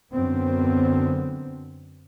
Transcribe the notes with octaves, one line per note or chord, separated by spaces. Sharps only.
F#2 D3 B3 C4